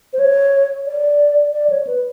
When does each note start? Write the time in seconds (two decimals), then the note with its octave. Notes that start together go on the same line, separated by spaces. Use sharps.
0.13 C5
0.19 C#5
0.87 D5
1.53 D5
1.70 C#5
1.87 B4